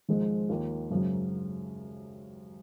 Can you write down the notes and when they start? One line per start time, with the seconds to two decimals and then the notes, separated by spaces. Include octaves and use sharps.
0.09 G#1 G#2 F3 G#3
0.49 D#2 D#3 A#3 F4
0.91 G#1 F#2 C#3 F#3